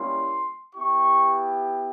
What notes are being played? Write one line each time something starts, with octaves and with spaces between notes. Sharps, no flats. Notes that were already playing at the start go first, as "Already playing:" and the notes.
Already playing: G3 A#3 C#4 E4 C6
B3 E4 G4 C#6